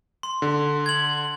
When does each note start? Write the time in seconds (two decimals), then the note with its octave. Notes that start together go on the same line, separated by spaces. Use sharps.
0.23 C6
0.42 D3
0.86 G#6 F#7